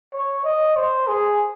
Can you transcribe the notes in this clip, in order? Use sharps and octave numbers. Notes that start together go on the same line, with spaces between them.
C#5
D#5
C5
G#4